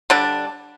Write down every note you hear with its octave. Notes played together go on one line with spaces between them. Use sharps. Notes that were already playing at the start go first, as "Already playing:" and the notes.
D3 G3 D4